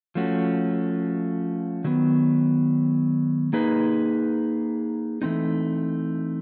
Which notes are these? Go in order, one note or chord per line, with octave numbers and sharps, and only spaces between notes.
F3 A3 C#4 F#4
D#3 F#3 B3
A#3 D#4 G#4 B4
E3 A3 C4 D#4